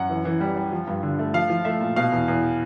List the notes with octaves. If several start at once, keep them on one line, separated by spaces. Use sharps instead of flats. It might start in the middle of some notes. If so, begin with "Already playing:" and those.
Already playing: F#2 F#5
E3
E3
G3
G3
F3
G2
D3
A3
F3 F5
F3
A3 E5
A#2
B2 F5
E2
E2